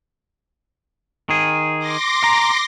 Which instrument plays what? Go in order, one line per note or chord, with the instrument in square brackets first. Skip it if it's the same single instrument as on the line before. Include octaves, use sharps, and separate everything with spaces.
[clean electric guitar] D#3 G#4
[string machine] C6 D6 A#6
[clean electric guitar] A#5